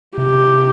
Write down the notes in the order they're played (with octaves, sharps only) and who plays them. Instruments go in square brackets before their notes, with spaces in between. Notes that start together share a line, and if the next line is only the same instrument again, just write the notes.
[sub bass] C3 [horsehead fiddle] G4